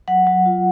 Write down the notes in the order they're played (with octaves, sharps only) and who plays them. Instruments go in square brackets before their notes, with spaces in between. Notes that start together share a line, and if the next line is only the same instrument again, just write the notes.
[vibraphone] F#3 F#5
F#3
F4